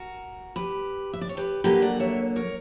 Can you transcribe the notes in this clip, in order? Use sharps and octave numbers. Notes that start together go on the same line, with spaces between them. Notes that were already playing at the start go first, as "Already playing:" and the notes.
Already playing: F#4 A#4
G4 B4
E5
D5
C#5
G4 B4
D3 F#3 A#3 G4 B4
D5 F#5
C#5 E5
A#4 C#5